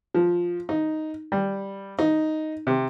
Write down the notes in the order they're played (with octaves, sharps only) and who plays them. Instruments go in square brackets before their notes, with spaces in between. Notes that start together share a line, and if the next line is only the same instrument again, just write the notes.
[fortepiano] F3
D#4
G3
D#4
C3